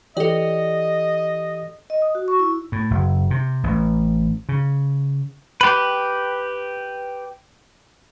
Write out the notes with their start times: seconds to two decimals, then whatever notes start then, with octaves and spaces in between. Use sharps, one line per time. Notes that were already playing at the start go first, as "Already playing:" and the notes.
0.17 E3 G4 A4 D5 D#5
1.90 D#5
2.02 D#6
2.15 F#4
2.28 C#6
2.39 E4
2.72 A2
2.91 F#1
3.31 C3
3.64 A1
4.49 C#3
5.61 G4 B4